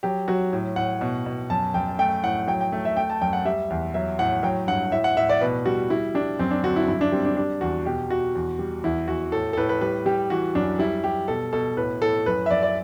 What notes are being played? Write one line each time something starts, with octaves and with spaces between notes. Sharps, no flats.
F#3 G4
F#3 F#4
A2
A2 F#5
B2
B2
F#2 A5
F#2 G5
A3 G5
A2 F#5
F#3 G5
G5
A3
E5
A3 G5
A5
F#2 G5
F#5
G3 E5
E2
F#3 E5
A2 F#5
F#3 G5
G2 F#5
A2 E5
F#5
A2 E5
D5
B2 B4
G3 F#4
G3 E4
G3 D4
F#2 C4
D4
D3 F#4
E4
G2 E4
D4
G3 C4
D4
G3 D4
E2 F#4
B2 G4
B2 F#4
E2
G3
E2 E4
E2 F#4
A2 A4
A4
A2 B4
B4
G3 B4
G3 G4
E3 F#4
F#2 D4
G3 E4
G3 G4
B2 A4
B2 A4
A2 B4
A2 A4
F#2 B4
E5
F#2 D5
D5